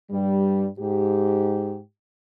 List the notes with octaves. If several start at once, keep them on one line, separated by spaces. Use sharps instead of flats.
G2 G3
G#2 G4